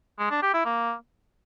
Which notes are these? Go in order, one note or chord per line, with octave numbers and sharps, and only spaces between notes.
G#3
D4
G4
E4
A#3